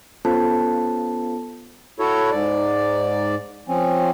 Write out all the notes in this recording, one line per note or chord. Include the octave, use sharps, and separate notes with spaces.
B3 C#4 F4 A4 C5 A5
E4 F#4 A4 C#5
G#2 D5
F3 C4 C#4